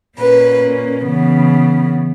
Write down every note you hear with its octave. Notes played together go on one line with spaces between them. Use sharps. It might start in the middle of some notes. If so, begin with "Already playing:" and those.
A#2 A#3 C#4 B4
C#3 E3 B3